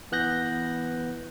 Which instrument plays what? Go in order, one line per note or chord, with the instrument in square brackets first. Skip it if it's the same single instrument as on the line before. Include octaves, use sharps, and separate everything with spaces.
[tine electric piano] E3 B3 F#6 G6 A#6